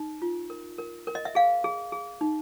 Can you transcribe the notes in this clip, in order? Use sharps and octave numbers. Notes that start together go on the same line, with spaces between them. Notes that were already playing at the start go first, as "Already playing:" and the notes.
Already playing: D#4
F4
A#4
A#4
A#4
D#5
E5
G#4 F5
G#4
G#4
D#4